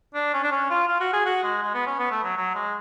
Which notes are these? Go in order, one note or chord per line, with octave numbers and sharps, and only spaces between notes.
D4
C#4
D4
C#4
F4
F4
F#4
G#4
F#4
G#3
G#3
B3
C#4
B3
A3
F#3
F#3
G#3